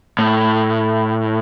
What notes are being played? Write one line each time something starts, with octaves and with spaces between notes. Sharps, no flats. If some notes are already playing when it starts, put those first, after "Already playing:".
A2